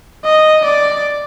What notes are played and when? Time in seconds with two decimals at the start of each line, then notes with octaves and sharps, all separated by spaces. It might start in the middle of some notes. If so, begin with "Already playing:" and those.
0.24 D#5
0.64 D5